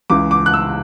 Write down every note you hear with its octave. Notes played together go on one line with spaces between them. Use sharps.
C#2 C#3 E3 D6
D6
F#6
E6